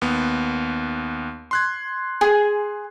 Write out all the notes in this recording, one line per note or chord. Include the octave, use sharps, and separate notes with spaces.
D#2 B3
C6 F#6 G#6
G#4 G#5